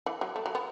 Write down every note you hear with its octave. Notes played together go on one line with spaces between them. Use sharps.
E3
F#3
A3
F#3
B3